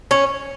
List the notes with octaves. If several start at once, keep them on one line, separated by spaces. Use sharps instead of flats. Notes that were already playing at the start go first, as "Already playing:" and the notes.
C#4